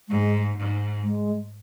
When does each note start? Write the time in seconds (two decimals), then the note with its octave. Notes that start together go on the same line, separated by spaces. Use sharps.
0.09 G#2 G#3
0.57 G#2
1.04 G#3